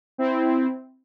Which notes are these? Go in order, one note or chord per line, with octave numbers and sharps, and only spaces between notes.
C4 E4